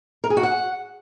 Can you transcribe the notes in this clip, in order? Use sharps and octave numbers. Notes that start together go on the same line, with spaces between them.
A#4
G#4
F#4
F#5